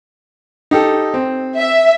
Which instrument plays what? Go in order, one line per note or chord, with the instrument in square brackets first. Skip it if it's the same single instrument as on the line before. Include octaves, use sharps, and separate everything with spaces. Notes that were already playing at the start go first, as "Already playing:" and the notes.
[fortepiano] D#4 G4 A4
C4
[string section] E5